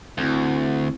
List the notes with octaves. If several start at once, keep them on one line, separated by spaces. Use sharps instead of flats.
D2 C4 E4